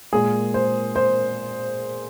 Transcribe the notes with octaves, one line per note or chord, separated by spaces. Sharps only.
A#2 G#3 G#4
C5
C5